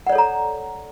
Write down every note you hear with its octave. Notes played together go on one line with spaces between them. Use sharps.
A4 C#5 D5 F#5 A#5